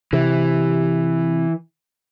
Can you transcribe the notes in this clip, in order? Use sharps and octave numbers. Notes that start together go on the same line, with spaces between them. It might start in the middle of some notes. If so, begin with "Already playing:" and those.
C3 E3